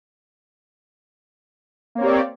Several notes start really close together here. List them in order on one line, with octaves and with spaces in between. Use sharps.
A#3 C#5 C4 G4 D5